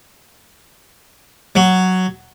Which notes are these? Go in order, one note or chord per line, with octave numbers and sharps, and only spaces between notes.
F#3